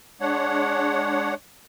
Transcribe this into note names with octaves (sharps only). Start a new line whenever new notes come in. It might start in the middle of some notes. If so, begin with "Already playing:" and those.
G#3 D4 C#5 F#5